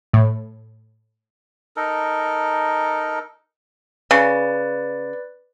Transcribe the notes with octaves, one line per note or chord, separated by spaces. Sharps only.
A2
D#4 A4 A#4
C#3 B4 D5